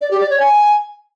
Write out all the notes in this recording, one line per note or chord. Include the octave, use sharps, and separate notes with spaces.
D5
G4
D5
C#5
G#5